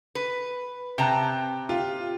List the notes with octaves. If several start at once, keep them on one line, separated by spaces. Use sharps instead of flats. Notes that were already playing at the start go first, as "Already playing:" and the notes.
B4
C3 G5 A5 A#5 F#6
F4 G4